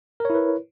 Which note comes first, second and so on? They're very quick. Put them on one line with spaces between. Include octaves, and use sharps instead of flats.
A#4 C#5 E4 B4